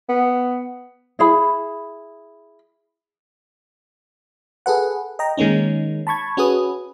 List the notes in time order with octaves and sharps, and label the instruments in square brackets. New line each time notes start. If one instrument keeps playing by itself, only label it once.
[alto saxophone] B3
[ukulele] E4 G#4 B5
[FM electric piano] G#4 A4 B4 F#5
D#5 G5 A#5
D#3 G#3 A#3 C#4 D#4
A5 B5 C#6 G#6
C#4 F#4 G#4 B4 D#6